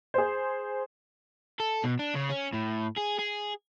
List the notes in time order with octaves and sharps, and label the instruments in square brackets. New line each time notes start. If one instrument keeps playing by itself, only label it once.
[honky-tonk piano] G#4 C5
[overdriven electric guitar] A4
B2
D4
C#3
C#4
A2
G#4
G#4